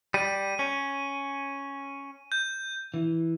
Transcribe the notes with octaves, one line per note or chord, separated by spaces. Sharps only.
G3 D#7
C#4
G6
E3